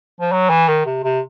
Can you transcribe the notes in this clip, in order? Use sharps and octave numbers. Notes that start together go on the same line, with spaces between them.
F3
F#3
E3
D#3
C3
C3